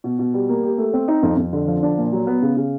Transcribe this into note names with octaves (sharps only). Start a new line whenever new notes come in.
B2
B2
G3
A#3
G4
A3
C4
D#4
F2
F2
D3
F3
D4
A#2
F#3
B3
C#3
C#3